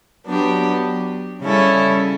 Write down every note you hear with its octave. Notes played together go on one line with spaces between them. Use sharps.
F#3 B3 D4 G4
C#3 G3 C#4 E4 A4